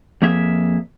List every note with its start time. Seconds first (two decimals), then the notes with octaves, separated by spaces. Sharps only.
0.22 F2 F3 A#3 G#4 E5